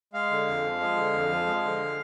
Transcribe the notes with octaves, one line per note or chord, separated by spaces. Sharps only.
G#3 F5
D3
F2
F3
G#3
D3
F2
F3
G#3
D3